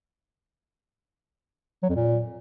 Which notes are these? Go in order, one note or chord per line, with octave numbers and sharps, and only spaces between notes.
F#3
F2
A#2